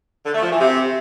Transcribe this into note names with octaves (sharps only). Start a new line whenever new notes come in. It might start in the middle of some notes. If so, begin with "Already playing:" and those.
D3
A3
F3
E3
C3